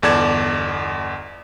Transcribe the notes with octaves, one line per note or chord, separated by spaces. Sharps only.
G1 E2 A4 D5 G#6 E7